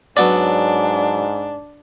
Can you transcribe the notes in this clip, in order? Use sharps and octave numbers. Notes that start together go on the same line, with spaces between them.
G#2 F#3 B3 C#4 D4 D5